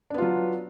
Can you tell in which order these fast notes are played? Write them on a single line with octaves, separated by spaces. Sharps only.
D4 B3 F4 F#3